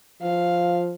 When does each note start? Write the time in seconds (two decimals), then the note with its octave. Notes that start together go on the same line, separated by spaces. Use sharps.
0.22 F3 F5